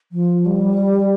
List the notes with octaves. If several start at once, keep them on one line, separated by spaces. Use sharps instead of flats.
F3
G3